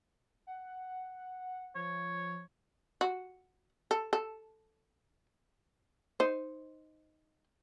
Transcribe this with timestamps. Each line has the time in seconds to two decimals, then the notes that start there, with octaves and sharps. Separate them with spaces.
0.47 F#5
1.75 F3 C#5
3.01 F#4
3.91 A4
4.13 A4
6.20 D#4 C5